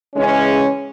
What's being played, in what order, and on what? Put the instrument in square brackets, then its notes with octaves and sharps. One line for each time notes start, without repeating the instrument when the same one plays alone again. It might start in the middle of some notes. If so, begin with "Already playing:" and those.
[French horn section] C#3 E3 G#3 C#4